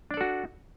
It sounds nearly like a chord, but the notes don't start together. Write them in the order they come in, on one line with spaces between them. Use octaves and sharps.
D4 D5 A4 F#4